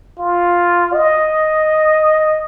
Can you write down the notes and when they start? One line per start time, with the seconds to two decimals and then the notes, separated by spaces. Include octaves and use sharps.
0.19 F4
0.94 D#5